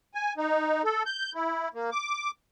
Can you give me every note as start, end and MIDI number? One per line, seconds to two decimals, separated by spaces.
0.14 0.33 80
0.37 0.82 63
0.84 1.03 69
1.06 1.32 91
1.35 1.68 64
1.74 1.90 58
1.92 2.31 86